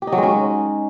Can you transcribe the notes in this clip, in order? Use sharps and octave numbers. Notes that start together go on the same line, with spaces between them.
G4
D#4
F#3
G#3
C#4